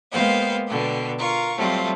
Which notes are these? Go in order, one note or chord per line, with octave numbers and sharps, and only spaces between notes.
G#3 A#3 B3 C5 F5 G5
B2 D3 G5
F4 A#4 C#6
F#3 G3 A3 C4 F4